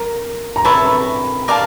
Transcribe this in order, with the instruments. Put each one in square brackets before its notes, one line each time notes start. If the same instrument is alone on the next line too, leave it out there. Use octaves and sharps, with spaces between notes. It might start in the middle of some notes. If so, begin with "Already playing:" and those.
Already playing: [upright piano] A#4 A#5
A#5
[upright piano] B4 B5 [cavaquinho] C#5 E5 A5
[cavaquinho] A#4 D5 F5 A5